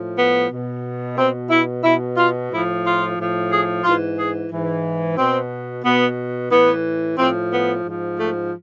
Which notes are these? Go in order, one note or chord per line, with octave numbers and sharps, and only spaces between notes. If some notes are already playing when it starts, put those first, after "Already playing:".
Already playing: A2 F3
B3
B2
B2 C4
E4
B2 E4
F4
A2 F3 E4
F4
A2 F3
G#4
G#2 E3 F4
G#4
G#2 E3
B2 C4
B2 B3
A2 E3 B3
A2 F3 C4
B3
G#2 F3
A3